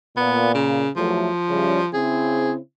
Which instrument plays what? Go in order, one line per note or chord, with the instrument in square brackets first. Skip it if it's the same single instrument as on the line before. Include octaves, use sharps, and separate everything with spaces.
[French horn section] A#2 [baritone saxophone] B3
[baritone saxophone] C#3
[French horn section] E2 F#3 A3 [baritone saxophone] F3
[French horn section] C#3 G3 E4
[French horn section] C#3 C4 E4 [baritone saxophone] G#4